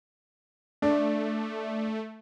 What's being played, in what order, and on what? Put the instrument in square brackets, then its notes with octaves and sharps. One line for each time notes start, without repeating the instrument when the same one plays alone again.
[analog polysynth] A3 [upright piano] D4